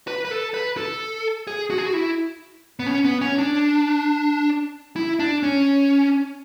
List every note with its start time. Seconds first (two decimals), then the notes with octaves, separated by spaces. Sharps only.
0.07 B4
0.25 B4
0.31 A4
0.54 B4
0.77 A4
1.47 G#4
1.70 F#4
1.78 G#4
1.86 F#4
1.94 E4
2.79 B3
2.87 C#4
3.05 B3
3.21 C#4
3.38 D4
4.96 E4
5.19 D4
5.43 C#4